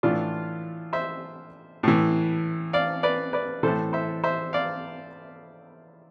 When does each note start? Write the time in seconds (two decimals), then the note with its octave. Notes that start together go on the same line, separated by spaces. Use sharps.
0.03 A2 E3 D4 F4
0.93 C5 E5
1.83 A2 E3
2.73 D5 F5
3.03 B4 D5
3.33 B4 D5
3.63 E3 A4 C5
3.68 A2
3.93 C5 E5
4.24 C5 E5
4.53 D5 F5